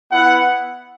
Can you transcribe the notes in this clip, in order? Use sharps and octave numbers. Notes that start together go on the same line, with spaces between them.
B3 E4 F#5